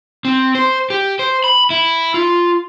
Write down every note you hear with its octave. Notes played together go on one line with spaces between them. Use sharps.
C4
C5
G4
C5
B5
E4
F4